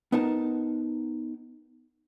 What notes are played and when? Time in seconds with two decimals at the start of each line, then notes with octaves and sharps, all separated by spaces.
0.12 B3 D#4 A#4 A5